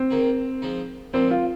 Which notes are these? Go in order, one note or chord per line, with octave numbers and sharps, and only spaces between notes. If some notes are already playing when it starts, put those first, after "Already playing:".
Already playing: C4
D#3 A#3 D#4 G#4
F3 G#3 D#4
A#2 F3 G#3 C4
F4